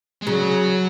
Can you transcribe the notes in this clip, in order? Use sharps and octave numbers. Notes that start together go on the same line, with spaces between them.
G#3
C#3 F#3